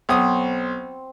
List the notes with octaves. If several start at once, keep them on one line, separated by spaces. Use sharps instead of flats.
B1 C4 D#6